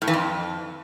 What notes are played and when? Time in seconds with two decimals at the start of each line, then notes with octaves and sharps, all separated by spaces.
0.02 A2
0.08 E3
0.13 F2